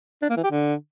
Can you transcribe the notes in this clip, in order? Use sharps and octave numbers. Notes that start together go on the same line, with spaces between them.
D4
A#3
E3
G4
D3